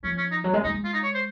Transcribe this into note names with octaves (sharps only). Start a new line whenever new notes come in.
F3 C#4
C#4
D#4
F#3
G#3
G#3 D#4
G#3
F4
D#4
C#5
C5